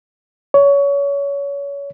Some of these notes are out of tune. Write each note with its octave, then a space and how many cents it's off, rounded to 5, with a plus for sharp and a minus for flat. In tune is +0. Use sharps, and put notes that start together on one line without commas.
C#5 +25